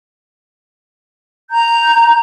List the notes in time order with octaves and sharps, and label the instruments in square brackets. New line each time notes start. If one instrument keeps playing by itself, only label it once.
[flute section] A#5 G6